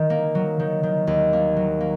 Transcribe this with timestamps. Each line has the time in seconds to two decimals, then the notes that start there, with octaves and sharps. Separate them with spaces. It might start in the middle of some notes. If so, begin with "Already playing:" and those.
Already playing: D#3
0.10 A#3
0.35 F#3
0.60 D#3
0.83 D#3
1.07 D#2
1.33 A#3
1.56 F#3
1.81 A#3